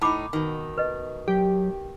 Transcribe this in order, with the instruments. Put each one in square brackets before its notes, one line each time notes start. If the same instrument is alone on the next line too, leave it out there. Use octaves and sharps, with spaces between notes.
[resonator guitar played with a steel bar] A2 D#4 [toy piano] A5 B5 D6
[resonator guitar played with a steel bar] B2 D#3
[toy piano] B4 D#5
[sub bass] F#3 [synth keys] G4